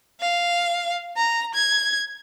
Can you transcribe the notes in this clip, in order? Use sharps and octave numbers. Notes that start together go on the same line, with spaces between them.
F5
A#5
G#6